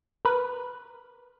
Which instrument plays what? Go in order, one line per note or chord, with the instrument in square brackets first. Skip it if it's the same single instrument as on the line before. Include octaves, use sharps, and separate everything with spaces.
[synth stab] A#4 B4